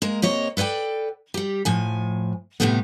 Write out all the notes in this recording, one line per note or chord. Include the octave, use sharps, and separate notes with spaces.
G#3 A#3 A#4
C3 A#3 C#5 D#5
A4 B4 C#5 D5 G5
G3 G4
A2 F3 G#5
A2 C3 F#3 G3 A3 B3